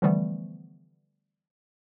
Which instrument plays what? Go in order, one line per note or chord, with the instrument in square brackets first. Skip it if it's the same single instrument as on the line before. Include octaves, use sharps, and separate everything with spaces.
[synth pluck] D3 E3 F3 G3 A3 B3